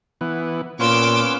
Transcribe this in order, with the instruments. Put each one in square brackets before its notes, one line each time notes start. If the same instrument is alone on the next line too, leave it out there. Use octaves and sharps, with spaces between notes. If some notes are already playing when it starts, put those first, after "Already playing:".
[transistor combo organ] E3 B3
[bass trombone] A#2 [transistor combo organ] B3 C#4 F5 [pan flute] C6 [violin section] D6 E6